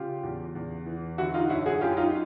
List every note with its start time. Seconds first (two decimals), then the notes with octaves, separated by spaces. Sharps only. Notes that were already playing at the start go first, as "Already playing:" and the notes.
Already playing: C#3 F4 G4
0.23 E2
0.55 E2
0.86 E3
1.18 D3 E4 F#4
1.34 D#4 F4
1.49 F#2 E4 F#4
1.66 F#4 G#4
1.81 F#2 F4 G4
1.97 D#4 F4